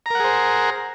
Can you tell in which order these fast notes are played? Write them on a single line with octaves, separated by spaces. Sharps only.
A#5 A#4 F#5 G#4 C5